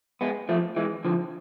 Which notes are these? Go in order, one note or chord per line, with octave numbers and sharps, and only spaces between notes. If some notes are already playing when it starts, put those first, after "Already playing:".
G#3 B3
F3 A3
E3 G#3
D3 F3